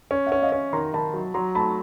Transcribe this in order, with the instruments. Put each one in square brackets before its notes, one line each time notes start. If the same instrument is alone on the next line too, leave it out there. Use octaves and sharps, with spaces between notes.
[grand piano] C#4
[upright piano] E5 F#5
[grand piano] C#4
[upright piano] D#5 F5
[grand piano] C#4
[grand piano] D#3 [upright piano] A#5 C6
[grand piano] D#3 [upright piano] A5 B5
[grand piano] F#3
[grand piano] F#3 [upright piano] A#5 C6
[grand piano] A3 [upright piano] A5 B5